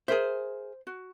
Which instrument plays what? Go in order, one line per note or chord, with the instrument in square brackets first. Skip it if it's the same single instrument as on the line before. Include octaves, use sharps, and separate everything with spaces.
[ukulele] G#4 A#4 E5 [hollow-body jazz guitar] C5
[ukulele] F#4